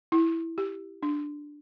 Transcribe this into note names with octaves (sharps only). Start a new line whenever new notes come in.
E4
G4
D4